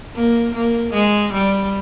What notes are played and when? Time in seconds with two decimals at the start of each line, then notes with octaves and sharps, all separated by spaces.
0.15 A#3
0.54 A#3
0.94 G#3
1.33 G3